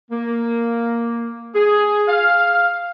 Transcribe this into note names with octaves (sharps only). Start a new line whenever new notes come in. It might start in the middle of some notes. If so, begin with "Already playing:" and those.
A#3
G#4
F5